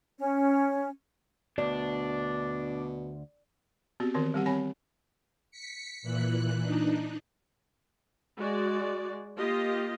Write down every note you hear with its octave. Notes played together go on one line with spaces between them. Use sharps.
C#4
D2 B2 D4 D5
B3 C4 F#4 G4
D#3 E3 C4 A#4
G3 C4 G4 F#5
C4 C#5 G#5 B5
B6 C#7
A#2 E3 F#6
D4 D#4
G#3 F#4 D5
A#3 F4 G4 D#5